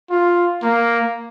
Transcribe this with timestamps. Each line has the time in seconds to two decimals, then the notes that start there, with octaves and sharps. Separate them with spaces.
0.10 F4
0.62 A#3